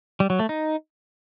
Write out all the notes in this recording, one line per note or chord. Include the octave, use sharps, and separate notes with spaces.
G3
F#3
A3
D#4